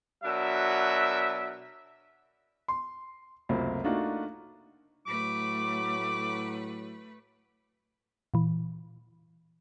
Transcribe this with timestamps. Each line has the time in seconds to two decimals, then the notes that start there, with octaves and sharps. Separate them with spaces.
0.24 B2 F#3 D4 A#4 E5
2.68 C6
3.49 C#2 F#2 C3 A3 A#3 C4
3.84 A3 A#3 D4 D#4 F4 F#4
5.06 A2 F#3 A3 B4 D6
8.34 A#2 E3